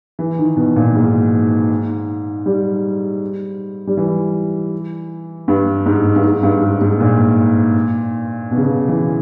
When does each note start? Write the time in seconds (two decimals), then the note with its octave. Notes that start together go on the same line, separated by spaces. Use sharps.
0.19 E3
0.39 D#3
0.57 B2
0.76 A#2
0.95 G#2
2.46 G3
3.87 G3
3.97 E3
5.48 G2
5.86 G#2
6.16 G2
6.24 G#2
6.43 G2
6.62 G#2
6.81 G#2
7.00 A#2
8.51 B2
8.57 C#3
8.65 B2
8.88 E3